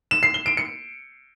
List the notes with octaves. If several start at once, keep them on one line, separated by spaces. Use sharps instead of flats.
E7
C7
G7
D7
C#7